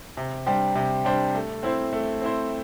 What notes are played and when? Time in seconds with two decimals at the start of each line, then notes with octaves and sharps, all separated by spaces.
0.17 C3
0.46 G3 D4 G4 C5
0.75 C3
1.05 G3 D4 G4 C5
1.35 A3
1.63 C4 E4 C5
1.93 A3
2.21 C4 E4 C5